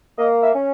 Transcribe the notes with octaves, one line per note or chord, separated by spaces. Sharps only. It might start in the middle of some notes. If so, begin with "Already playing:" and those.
A#3 D#5
E5
C#4